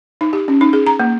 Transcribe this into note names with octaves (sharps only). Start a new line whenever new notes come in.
D#4
G4
C#4
D#4
G#4
A#5
A#3